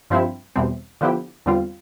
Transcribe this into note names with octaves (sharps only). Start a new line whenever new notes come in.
G2 F3 C4 E4
E2 B2 G3 C4
D3 F3 B3 E4 G4
E2 D3 G3 C4 F4